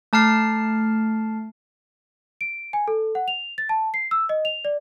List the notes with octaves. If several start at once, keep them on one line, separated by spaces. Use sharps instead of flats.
A3 A5 F6 C7
D7
G#5
A4
F#5
F7
A6
A5
C7
E6
D#5
F7
D5